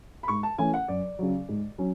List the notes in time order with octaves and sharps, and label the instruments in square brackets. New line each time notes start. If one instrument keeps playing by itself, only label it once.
[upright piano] B5
[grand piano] G#2 [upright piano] C#6
[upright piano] A5
[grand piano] E3 A3 C#4 [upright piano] G#5
[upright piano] F#5
[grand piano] F#2 [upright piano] D5
[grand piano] C#3 F#3
G#2
F#3 C#4